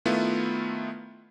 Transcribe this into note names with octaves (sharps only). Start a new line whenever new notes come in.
D#3 A3 B3 E4 F4